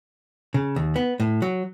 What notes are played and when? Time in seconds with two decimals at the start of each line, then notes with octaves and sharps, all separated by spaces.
0.54 C#3
0.76 D#2
0.96 B3
1.20 A2
1.42 F#3